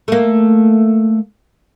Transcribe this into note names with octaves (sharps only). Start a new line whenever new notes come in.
A3 A#3